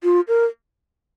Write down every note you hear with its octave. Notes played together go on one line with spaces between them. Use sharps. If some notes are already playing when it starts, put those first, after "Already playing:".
F4
A#4